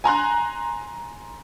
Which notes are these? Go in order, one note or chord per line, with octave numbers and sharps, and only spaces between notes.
G#5 A#5 C6 F#6